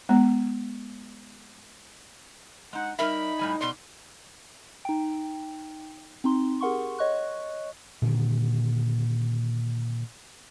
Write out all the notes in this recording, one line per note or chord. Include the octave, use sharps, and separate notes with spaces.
G#3 B3
G#3 D#4 F#5
G3 D#4 A#4 E5 B5
A2 G3 G#5
B2 D5 C6
D#4 G5
C4 D#4 C6
G4 G#4 A#4 F#5 C6 C#6
C#5 D#5 C#6 F#6
A#2 D3 D#3